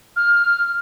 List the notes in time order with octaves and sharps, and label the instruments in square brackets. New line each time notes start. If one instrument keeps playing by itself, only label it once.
[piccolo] F6